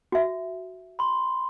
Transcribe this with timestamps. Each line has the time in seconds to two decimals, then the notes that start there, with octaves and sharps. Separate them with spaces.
0.12 F#4 E5
0.99 B5 C6